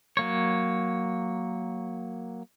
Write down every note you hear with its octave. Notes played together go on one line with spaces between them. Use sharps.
F#3 A#3 C#5